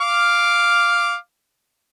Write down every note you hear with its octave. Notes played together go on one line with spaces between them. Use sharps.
F5 D6 F6